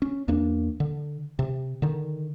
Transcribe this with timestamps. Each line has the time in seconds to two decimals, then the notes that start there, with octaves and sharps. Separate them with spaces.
0.02 C#4
0.28 E2 A#3 D4
0.80 D3
1.39 C3
1.82 D3 D#3